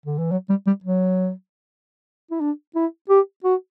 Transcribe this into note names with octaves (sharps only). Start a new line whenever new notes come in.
D3
E3
F#3
G3
G3
F#3
E4
D4
E4
G4
F#4